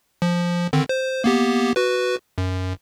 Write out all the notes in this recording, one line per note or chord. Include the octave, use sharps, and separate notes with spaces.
F3
D3 D#3 C4
C5
A#3 B3 G4
F#4 B4
F#2